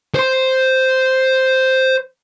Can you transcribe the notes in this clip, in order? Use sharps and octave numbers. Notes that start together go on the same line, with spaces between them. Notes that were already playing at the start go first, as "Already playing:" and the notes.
C5 C6